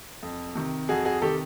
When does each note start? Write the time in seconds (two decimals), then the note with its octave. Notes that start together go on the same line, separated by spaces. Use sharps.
0.23 F2
0.55 C3 D#3
0.89 F2 F#4 G#4
1.05 F#4 G#4
1.22 C3 D#3 G4 A4